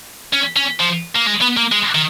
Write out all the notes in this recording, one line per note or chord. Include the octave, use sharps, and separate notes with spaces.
C#4
C#4
F3
A#3
G#3
B3
A#3
G#3
D#3